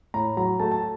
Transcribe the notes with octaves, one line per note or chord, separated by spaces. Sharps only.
A2 A#5
F#3 A#5
A3 A5
A5